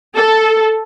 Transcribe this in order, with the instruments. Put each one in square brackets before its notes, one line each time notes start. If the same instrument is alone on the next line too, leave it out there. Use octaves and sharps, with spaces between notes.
[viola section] A4